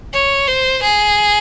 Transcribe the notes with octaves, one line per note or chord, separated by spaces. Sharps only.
C#5
C5
G#4